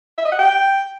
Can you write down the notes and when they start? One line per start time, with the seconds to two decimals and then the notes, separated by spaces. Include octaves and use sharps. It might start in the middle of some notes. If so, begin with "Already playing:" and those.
0.18 E5
0.25 D#5
0.32 F#5
0.39 G5